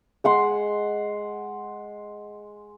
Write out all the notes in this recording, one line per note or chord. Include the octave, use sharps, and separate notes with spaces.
G#3 F#5 C6